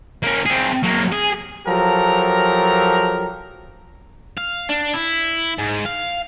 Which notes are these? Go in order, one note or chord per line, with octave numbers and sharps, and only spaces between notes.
A#3 C#4
C4 G#4
F#3 A#3
G#4
F3 F#3 G4 A4 A#4 A#5
F5
D4
E4
G#2
F5